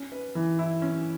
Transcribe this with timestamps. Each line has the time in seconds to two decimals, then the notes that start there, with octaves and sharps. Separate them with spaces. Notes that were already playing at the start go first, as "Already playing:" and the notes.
Already playing: C#4
0.12 B4
0.35 E3
0.59 E4
0.82 C#4